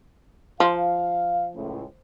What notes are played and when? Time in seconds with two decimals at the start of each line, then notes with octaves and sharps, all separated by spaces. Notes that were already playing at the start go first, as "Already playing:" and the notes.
0.60 F3 F5
1.54 C#2 A2